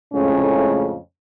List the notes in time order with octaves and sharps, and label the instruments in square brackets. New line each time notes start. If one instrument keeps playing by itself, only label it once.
[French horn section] F2 A2 C#3 G#3 A3 C#4